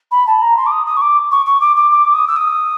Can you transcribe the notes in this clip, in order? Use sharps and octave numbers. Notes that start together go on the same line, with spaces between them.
B5
A5
A#5
C6
D6
D#6
D#6
C#6
D6
C#6
C#6
D6
D6
D6
D#6
E6
D#6